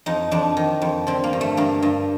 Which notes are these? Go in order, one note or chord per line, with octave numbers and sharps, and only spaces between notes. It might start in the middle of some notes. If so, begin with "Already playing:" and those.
F2 D#4
F2 D4
D#3
F2
D3 C4
A#3
G2
A3
G2 A#3
G2